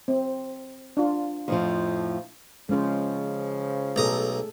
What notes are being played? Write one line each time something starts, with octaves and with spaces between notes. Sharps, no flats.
C4
D4 F4
F2 A2 F3
C#3 F3 G#3 C#4 C5
B1 A3 G#4 A4 A#5 D#6